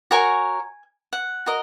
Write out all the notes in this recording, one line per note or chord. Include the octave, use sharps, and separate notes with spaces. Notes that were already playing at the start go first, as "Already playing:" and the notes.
F#4 A#4 C#5 G#5
F#5
F#4 A#4 D#5